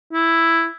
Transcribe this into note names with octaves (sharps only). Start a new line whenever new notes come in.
E4